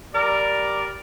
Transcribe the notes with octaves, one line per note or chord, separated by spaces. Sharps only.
G3 A#4 D5